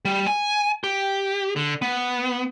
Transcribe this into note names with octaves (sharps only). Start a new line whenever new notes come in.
G3
G#5
G4
D3
B3